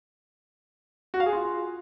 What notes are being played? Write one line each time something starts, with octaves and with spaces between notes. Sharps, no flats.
F#4
F5
G#4
F4